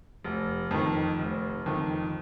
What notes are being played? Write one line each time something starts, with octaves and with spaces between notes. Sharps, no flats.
F1
F2 D#3
F1
F2 D#3